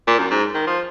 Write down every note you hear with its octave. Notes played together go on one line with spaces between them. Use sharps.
A#2
F#2
G#2
D#3
F3